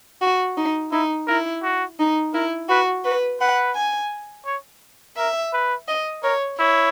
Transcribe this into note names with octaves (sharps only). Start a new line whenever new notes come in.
F#4
D#4
D#4 E4
E4 A#4
F#4
D#4
E4 A#4
F#4 B4
F#4 B4
B4 F#5
G#5
C#5
A#4 E5
B4
D#5
A#4 C#5
E4 C#5